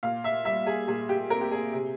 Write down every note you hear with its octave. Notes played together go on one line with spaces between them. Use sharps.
A#2 F5
E5
G3 E5
G#4
A#2 G#4
G4
C4 A#4
G4
G#4
C3